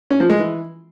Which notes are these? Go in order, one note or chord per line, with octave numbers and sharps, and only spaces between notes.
C#4
F3
G#3
E3